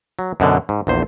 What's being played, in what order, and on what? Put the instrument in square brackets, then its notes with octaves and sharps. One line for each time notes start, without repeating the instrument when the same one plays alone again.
[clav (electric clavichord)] F#3
F#2 B2 D3
G#2
A#1 E2 C5